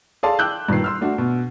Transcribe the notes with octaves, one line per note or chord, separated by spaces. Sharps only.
G#4 A4 D5 F5 A5 C6
G5 D6 E6 F#6 G6
G2 A#2 D#3 B4 C7
C6 E6 F6
A3 D4 F#4
B2